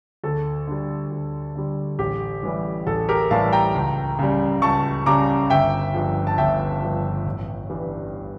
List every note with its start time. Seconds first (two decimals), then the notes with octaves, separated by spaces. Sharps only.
0.23 D2 A4
0.67 D3 G3
1.11 D2
1.55 D3 G3
1.99 A1 G4
2.43 A2 E3 G3
2.87 A1 A4
3.09 G4 A#4
3.31 A2 E3 G3 F5 A5
3.53 G5 A#5
3.75 C#2
4.19 C#3 G3
4.62 C#2 A5 C#6
5.06 C#3 G3 A#5 D6
5.50 G1 E5 G5
5.94 G2 F3
6.27 A5
6.38 G1 E5 G5
6.82 G2 F3
7.26 A1
7.70 G2 E3 G3